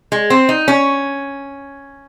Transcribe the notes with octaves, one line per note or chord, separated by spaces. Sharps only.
G#3
C4
D#4
C#4